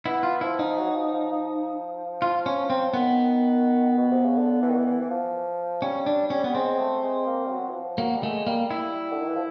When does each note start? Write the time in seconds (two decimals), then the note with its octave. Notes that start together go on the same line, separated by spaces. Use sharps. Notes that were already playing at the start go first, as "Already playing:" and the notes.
0.05 B3 E4
0.23 F4
0.41 F3 E4
0.59 D#4
0.78 F#3
0.95 F3
1.13 F3
1.31 F3
2.22 F4
2.46 C#4
2.70 C4
2.93 D#3 B3
3.97 B2
4.11 C3
4.24 C#3
4.38 D3
4.62 E3
4.69 D#3
4.76 E3
4.86 E3
5.02 E3
5.10 F3
5.82 G3 C#4
6.06 D4
6.30 C#4
6.44 B3
6.54 G#3 C4
6.78 A3
7.02 G#3
7.26 A#3
7.46 G3
7.50 F#3
7.69 E3
7.74 F3
7.98 F#3 A#3
8.17 G3
8.23 G#3 A3
8.47 G3 A#3
8.71 E4
9.12 D3
9.20 D#3
9.27 E3
9.35 F3